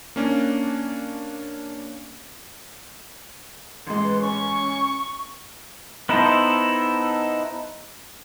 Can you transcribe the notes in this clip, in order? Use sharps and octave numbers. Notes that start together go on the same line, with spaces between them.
A#3 C#4 D4
A1 G#3 C6
B4
C#4 C#6
B3 D#4 E4 A4 C5